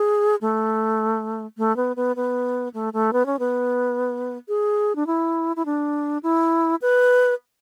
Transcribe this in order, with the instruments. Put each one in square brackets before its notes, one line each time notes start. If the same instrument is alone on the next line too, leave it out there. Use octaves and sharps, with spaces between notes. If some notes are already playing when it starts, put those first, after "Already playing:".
Already playing: [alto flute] G#4
A3
A3
B3
B3
B3
A3
A3
B3
C#4
B3
G#4
D4
E4
E4
D4
E4
B4